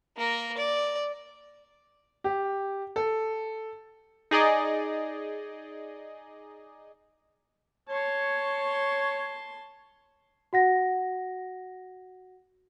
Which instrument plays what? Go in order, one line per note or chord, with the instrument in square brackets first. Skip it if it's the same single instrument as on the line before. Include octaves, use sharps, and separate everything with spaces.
[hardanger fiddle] A#3 A#4
D5
[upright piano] G4
A4
[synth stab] D#4 G#4 D5 D#5
[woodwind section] C#5 [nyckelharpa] A5 C6
[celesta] F#4 F#5 A#6